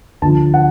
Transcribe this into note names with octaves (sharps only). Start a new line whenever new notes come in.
D2 D3 F3 A5
F#5